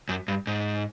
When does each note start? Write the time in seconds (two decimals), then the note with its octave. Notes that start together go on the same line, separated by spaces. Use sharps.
0.09 F#2
0.28 G2
0.47 G#2